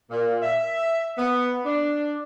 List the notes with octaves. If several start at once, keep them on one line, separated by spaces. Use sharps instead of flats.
A#2
E5
B3
D4